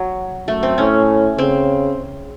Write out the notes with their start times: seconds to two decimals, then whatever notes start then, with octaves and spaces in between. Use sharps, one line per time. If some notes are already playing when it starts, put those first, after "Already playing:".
Already playing: F#3
0.47 F#2 A3
0.63 C4
0.78 A2 C#4
1.38 C#3 C4